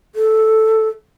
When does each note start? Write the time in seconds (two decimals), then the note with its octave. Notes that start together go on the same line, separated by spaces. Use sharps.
0.15 A4